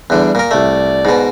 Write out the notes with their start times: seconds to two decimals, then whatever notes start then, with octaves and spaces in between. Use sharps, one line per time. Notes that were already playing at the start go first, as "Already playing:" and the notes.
0.10 E2 D3 G3
0.35 A#2 A#4
0.51 C2 A3 D5
1.05 G#2 B2